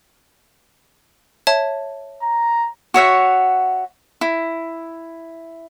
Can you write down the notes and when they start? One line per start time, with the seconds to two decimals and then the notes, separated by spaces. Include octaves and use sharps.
1.47 C#5 E5 A5
2.22 A#5
2.94 F#4 C#5 E5 F#5
4.21 E4